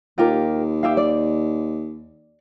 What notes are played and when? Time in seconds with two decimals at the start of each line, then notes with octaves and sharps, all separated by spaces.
0.18 D#2 F4 G4 A#4
0.83 G4 E5 F5
0.97 D5